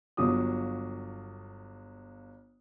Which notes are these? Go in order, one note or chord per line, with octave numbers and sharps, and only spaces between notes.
G1 F#3 F4 D6 D#6